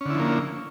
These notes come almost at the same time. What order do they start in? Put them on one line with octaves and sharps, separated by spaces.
C#4 D3 E4 F3 A#3